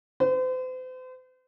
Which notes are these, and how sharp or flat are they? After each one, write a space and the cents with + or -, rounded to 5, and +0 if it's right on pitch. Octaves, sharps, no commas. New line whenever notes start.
C5 -40